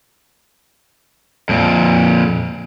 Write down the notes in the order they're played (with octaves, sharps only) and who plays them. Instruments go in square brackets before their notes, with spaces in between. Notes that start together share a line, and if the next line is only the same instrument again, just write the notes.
[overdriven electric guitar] F2 A#2